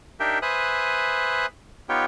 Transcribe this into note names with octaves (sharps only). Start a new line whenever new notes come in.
D4 D#4 G4 A#4 E5 G5
B4 C5 E5 G#5 D#6 F#6
B3 D#4 F4 G4 C#5 G5